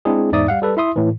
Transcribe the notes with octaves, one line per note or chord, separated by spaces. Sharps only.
G#3 C4 D4 E4 G#4
E2 G#2 D#4 D5 E5 D#6
G3 F5 F#5
G3 A4 B4
E4 E5 C6 D#6
A2 E3